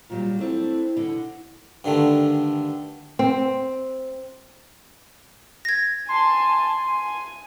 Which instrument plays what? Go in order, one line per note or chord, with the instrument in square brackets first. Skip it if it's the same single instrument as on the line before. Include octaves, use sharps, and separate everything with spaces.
[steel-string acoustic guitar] A#2 F#3 G3 [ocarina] F4
[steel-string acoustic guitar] A3 C4 D4 [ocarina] E4
[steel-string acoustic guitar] B2 D3
[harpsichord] G2 D3 D#3 A3
[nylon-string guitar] C4
[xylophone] G#6 A#6
[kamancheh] G#5 A5 [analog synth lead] C6
[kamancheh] G#5